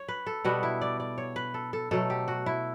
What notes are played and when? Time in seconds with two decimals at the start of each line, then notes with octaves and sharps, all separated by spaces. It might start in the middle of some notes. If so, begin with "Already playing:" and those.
Already playing: C#5
0.08 B4
0.26 A4
0.45 B2 G3 B3 F#4
0.63 E4
0.81 D5
1.00 D5
1.18 C#5
1.36 B4
1.54 A4
1.73 A4
1.91 B2 F#3 A3 A4
2.10 G4
2.28 F#4
2.46 E4